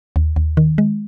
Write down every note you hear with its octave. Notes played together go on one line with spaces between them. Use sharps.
D#2
D#2
D#3
G#3